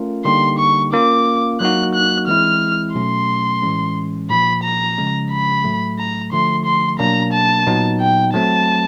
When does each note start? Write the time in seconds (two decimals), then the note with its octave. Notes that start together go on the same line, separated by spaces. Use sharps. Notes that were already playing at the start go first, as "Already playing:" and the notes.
Already playing: A3 C#4 F4 A#4
0.25 D3 G3 A#3 D#4 G4 C6
0.59 C#6
0.93 A#3 C#4 F4 A#4 D6
1.60 F#3 A#3 D#4 F#4 F#6
1.95 F#6
2.28 E3 G#3 C4 E4 F6
2.95 B2 F#3 A3 C#4 C6
3.63 A2 E3 G#3 C#4
4.30 A#2 F3 A#3 B5
4.63 A#5
4.98 C#3 F3 G#3 C#4
5.31 B5
5.64 A2 F#3 A3
5.99 A#5
6.32 D3 F3 A3 C6
6.65 C6
6.99 B2 F#3 A#3 D4 A#5
7.33 A5
7.67 A#2 F#3 B3 D#4
8.01 G5
8.34 F#3 A3 C4 A5